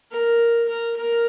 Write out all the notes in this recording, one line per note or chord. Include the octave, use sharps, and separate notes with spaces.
A#4
A#4
A#4